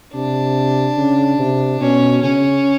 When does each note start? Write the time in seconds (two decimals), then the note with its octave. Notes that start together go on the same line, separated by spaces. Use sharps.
0.14 C3 D4
0.97 C#3
1.38 C3
1.80 B2 C#4
2.22 C#3 C#4